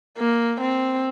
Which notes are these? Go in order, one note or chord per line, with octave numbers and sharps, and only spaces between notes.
A#3
C4